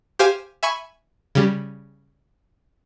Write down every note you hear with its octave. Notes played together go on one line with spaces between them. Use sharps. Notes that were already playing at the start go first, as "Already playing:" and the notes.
G4 C5 F5 G#5
E5 G#5 B5 C#6
C#3 G3